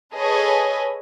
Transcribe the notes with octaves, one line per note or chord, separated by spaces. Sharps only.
G#4 A4 B4 C#5 D#5 G#5